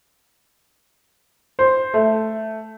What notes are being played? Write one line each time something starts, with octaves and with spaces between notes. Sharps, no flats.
C5
A3